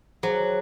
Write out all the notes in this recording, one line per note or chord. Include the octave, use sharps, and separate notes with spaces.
F#3 G#4 C5